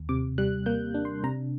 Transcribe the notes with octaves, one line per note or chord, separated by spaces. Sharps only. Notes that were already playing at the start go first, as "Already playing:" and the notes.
Already playing: D#2
C3 D6
G3 F#6
A#3 G6
D4
C6
C3 A#5